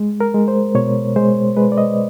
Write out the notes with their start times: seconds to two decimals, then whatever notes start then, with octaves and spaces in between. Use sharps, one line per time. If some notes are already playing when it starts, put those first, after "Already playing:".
Already playing: G#3
0.20 A#4
0.34 G#3
0.48 C5
0.75 B2 C#5
1.16 G#3 C5
1.57 G#3 B4
1.72 D5
1.78 D#5